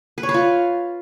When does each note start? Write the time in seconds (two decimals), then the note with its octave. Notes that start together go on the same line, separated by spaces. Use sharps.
0.18 B4
0.23 C#5
0.29 B4
0.34 F4